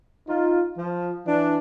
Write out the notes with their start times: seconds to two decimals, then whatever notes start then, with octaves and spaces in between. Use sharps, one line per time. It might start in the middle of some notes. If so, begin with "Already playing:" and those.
0.29 D#4 F4
0.78 F3
1.27 E3 D4